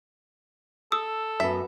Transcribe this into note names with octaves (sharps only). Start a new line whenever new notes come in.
A4 D#6 E6
F#2 B3 E5